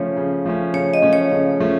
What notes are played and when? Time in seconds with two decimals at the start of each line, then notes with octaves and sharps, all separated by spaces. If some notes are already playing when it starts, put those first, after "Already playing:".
Already playing: C#3 F3 A3 C#4 C#5
0.17 C#3
0.46 F3 A3 C#4
0.74 C#3 C#5
0.94 D#5
1.02 F3 A3 C#4
1.13 C#5
1.31 C#3
1.60 F3 A3 C#4